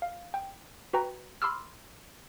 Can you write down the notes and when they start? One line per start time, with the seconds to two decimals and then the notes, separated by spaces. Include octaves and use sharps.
0.02 F5
0.34 G5
0.93 F#4 B4 G5 A#5
1.42 B5 C6 D6 E6 F6